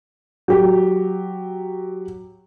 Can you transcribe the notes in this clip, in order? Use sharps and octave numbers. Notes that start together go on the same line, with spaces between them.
F#3 G4